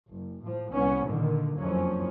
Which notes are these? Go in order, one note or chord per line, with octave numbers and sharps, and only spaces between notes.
F#1
A2 F3
C2 B3 C#4
A#2 D3 D#3
F#1 F2 F3 F#3 C#4